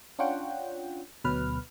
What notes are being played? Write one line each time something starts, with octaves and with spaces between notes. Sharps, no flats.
C#4 D4 F4 C#5 F#5 G5
D2 B2 F#3 B4 F6